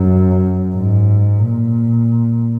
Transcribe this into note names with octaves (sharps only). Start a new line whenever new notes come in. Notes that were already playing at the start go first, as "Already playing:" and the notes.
Already playing: F#2
G#2
A#2